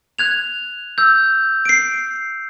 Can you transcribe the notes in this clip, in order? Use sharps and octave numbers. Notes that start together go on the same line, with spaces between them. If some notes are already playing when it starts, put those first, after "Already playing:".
F#6 G#6 F7
E6 G6
C7 D7